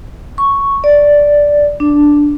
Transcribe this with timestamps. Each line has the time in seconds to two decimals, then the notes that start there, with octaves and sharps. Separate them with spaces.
0.38 C#6
0.84 D5
1.80 D4